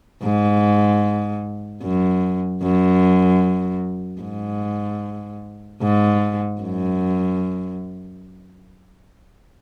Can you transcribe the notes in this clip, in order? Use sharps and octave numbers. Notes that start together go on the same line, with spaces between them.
G#2
F#2
F#2
G#2
G#2
F#2